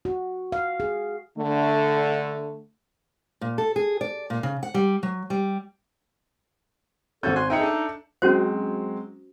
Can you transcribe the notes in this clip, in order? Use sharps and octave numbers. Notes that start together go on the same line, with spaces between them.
F#4
F5
G#4
D3 A3
A#2
A4
G#4
D5
A#2
C#3
F#5
G3
F#3
G3
G#1 C#4 F#4 A4 G6
G#5 C6 F#6
D#4 G#4 D#5 E5 G5 C#7
D4 A4
F#3 G#3 C4 C#4 F#4 C5